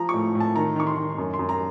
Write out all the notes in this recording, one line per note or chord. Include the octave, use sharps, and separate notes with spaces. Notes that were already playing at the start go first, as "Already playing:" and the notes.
Already playing: F3 A#5
A2 C#6
A2
A5
D#3 A#5
D#3 C#6
C6
D#3
F#2
C6
F#2
A#5